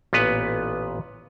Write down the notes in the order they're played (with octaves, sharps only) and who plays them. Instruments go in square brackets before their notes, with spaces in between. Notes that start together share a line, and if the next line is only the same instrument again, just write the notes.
[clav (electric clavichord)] A1 A#2 B3 B4